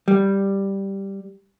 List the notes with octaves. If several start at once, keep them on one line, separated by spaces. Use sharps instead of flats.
G3